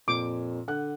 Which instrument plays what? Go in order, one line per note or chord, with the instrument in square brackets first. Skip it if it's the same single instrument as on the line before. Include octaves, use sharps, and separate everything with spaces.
[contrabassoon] F2 [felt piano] A#2 [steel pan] D6
[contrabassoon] D3 [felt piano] F#5 F#6